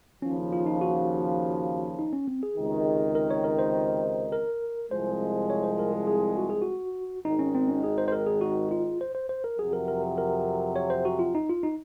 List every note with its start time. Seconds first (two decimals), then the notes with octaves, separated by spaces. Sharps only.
0.22 D#2 C#3 F3 C#4
0.53 F4
0.66 D#4
0.81 F#4
1.99 D#4
2.13 C#4
2.28 C4
2.43 G#4
2.56 C#2 C3 D#3
3.15 A#4
3.30 C#5
3.44 A#4
3.59 C5
4.32 A#4
4.90 C2 C3 F3 G#3 C5
5.50 C#5
5.63 C5
5.79 A#4
5.93 G#4
6.07 G#4
6.37 F#4
6.50 G#4
6.62 F#4
7.25 G#1 G#2 D#3 D#4
7.39 C#4
7.55 C4
7.68 C#4
7.84 G#4
7.98 C5
8.08 C5
8.12 A#4
8.27 G#4
8.41 F#4
8.71 F4
9.01 C5
9.15 C5
9.29 C5
9.44 A#4
9.59 F2 C3 F#3 G#4
9.73 A#4
9.88 A#4
10.18 A#4
10.76 C#5
10.90 C5
11.05 F#4
11.19 F4
11.35 D#4
11.49 F4
11.63 D#4